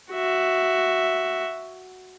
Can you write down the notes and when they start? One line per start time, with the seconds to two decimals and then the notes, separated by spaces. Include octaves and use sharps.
0.12 F#4 E5